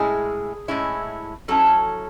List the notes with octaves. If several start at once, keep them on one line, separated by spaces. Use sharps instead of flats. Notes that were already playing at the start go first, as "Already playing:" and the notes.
Already playing: A2 G#3 C#4 E4 G#4
A2 G#3 C#4 E4
F#3 C#4 E4 A4